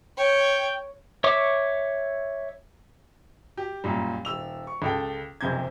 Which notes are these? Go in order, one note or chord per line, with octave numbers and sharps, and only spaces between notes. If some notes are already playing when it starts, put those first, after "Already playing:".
C#5 G5
C#5 E5 C#6 D6
G4
F#2 A#2 G3
D#1 E6 F7
C#6
C#2 A4 G5
F#1 F2 C3 G6 G#6